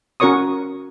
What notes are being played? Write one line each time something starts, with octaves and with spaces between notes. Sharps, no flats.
C#4 F#4 A#4 C#5 C#6 D#6